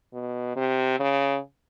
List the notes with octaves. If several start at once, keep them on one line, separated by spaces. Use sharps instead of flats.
B2
C3
C#3